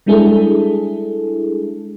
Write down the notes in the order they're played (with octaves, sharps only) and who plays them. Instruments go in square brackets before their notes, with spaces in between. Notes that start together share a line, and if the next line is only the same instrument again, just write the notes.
[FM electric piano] G3 G#3 D4 E4 G#4 A4